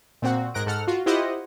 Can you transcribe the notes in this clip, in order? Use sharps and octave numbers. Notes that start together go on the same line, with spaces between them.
A#2 C4 F#4
G#2 A#4 F#6 A#6 D7
G#2 A4 F#5 F6
F4 F#4
E4 F4 G4 C5 D#5 F#5